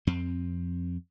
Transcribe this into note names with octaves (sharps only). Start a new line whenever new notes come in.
F2 C4